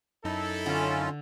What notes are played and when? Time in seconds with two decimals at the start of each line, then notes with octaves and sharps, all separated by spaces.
0.24 F#2 D#4 E4 A4
0.66 D3 C#4 D4 F4